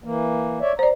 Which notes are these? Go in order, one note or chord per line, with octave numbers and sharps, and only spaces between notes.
E3 A#3
C#5 D5 E5
C5 D5 A#5